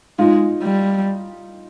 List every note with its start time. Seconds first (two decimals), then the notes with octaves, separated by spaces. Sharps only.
0.19 G#3 D#4 F4
0.63 G3